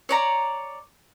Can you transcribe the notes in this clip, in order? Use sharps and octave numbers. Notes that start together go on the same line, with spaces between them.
C#5 D5 A#5